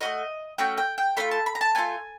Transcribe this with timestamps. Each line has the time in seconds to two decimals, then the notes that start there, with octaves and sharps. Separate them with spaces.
0.01 A3 C#4 F#4 D#5
0.58 A3 C#4 F#4 G5
0.78 G5
0.98 G5
1.17 A3 D4 F4 B5
1.31 A5
1.46 B5
1.55 A#5
1.61 A5
1.75 A3 D4 F4 G#5